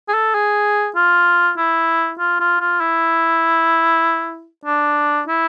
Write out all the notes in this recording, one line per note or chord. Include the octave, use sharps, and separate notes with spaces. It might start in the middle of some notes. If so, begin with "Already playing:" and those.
G#4
A4
G#4
F4
E4
F4
F4
F4
E4
D4
E4